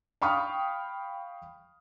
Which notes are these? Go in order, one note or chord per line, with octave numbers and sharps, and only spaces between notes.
F5 G5 B5 C#6 D#6 F6